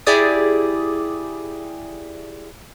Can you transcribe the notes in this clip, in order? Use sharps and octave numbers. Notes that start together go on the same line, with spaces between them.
E4 G4 G#4 D5 D#6